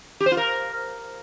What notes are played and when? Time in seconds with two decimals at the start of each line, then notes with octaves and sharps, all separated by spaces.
0.20 G4
0.26 C5
0.32 F4
0.37 A#4